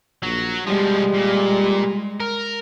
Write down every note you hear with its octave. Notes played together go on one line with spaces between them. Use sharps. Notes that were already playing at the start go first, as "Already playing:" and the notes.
A#1 F#3
B2 F3 G3 G#3
A#2
A#4